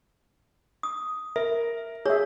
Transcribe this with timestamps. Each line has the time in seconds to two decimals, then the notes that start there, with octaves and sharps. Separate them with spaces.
0.83 D#6
1.36 A#4 E5
2.06 G#4 C#5 E5